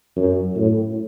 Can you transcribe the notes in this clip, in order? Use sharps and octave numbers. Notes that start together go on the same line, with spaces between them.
F#2
A2